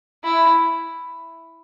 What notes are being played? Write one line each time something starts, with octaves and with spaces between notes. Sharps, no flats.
E4